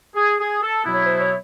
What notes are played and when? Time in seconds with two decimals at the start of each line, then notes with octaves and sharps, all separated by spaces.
0.15 G#4
0.39 G#4
0.62 A4
0.85 B2 F#3 B3 E4
0.93 C#5
1.03 C5
1.19 C#5